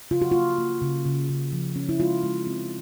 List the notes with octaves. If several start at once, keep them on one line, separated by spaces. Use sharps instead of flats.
C#3 F4
F#4
A#3 F4
A#3
C#3
C#3
C#3
F3
C#4
E4
G#3 F4
G#3
C4